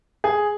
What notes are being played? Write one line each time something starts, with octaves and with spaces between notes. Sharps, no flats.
G#4